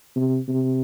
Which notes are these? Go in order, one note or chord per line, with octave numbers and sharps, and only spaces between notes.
C3
C3